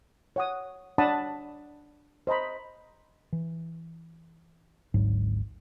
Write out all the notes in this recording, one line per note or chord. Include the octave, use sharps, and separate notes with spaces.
C#5 F#5 D#6
D4 C#5 F#5 A5 B5 D#6
C5 D#5 A#5 B5
E3
G#1 D2 G#2 F#3